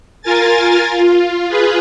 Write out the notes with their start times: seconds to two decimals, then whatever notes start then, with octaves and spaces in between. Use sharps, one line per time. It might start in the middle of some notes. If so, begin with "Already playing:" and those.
0.22 F4 A#4 G#5 A6
0.90 F4
1.47 F4 G#4 B4